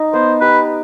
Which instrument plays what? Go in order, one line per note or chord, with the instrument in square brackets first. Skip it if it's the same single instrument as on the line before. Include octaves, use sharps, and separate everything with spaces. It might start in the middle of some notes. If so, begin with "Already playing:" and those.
Already playing: [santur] D#4
[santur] B3 [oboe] C5
[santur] G4 [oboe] B4